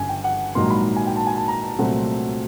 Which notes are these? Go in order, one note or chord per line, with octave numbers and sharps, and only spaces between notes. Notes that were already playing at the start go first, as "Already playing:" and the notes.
Already playing: G1 F#2 C#3 G#5
G5
F#5
A#1 G#2 D#3 F#3 A#3 C6
B5
G#5
G5
A5
G#5
A5
A#5
C2 A#2 F#3 A3 C4 F#5